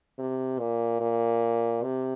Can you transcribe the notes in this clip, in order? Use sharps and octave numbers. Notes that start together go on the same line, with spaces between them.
C3
A#2
A#2
C3